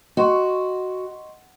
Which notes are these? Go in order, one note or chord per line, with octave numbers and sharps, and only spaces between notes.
F#4 D#5 C6 C#6